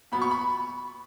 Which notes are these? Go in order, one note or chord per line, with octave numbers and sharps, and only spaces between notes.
A#2 F#3 B3 B5
C#6
B5